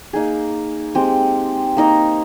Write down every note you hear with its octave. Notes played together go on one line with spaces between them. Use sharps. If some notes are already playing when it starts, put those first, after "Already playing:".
A#3 D#4 G#4
G#3 C4 G4
A#3 D#4 A#4